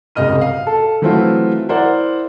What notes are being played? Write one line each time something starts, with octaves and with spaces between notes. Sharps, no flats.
F#1 C2 G#2 D#5 F6 D#7
F5
A4
E3 F#3 A3 C4 E4 F4
E4 A#4 C5 D5 F#5